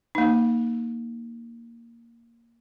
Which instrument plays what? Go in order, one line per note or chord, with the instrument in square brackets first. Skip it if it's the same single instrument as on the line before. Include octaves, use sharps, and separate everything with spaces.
[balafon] A#3 D#4